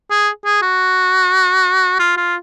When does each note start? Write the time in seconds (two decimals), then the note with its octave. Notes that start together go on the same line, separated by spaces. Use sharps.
0.11 G#4
0.45 G#4
0.62 F#4
2.00 F4
2.17 F4